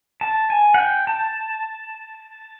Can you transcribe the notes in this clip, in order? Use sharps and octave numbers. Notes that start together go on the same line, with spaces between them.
A5
G#5
F#5
G5
A5